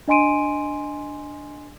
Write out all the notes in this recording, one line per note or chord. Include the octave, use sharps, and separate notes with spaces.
D4 D#5 G#5 C6 D7 D#7